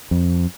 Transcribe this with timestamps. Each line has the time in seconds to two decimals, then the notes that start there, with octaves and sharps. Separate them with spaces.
0.11 F2